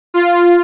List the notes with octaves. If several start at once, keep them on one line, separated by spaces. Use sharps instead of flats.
F4